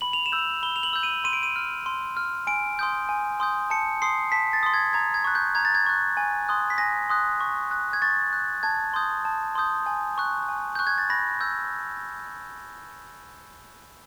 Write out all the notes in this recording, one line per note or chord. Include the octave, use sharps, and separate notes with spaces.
B5 F#7
F7
E7
E6 G6
F7
B5 G7
F7
F#7
E6 G6
D#7
C6 D#7
D7
D#7
F6
C6
F6
G#5 D7
C6 D#6 G6
G#5
C6 D#6 G6
A5 C#7
C6 D#6 C7
A5 B6
A6
C6 D#6
G#6
A#5 G#6
G#6
C#6 F#6
G6
A#5 G#6
A6
G#6
C#6 F#6
G#5
C6 D#6 F#6
B6
G#5 A#6
C6 D#6 F#6
C#6
F#6
G#6
C#6 A6
F#6
A5 G#6
C6 D#6 G6
A5
C6 D#6 G6
G#5
C#6 F#6
G#5
C#6 F#6 G6
G#6
A6
B5 A#6
E6 G6